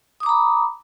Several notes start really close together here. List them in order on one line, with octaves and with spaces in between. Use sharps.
D#6 D6 A#5 B5